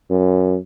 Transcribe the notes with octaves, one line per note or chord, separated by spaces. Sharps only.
F#2